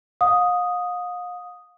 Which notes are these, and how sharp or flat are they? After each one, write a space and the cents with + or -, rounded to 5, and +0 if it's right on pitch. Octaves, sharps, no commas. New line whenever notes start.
F5 +40 D#6 +0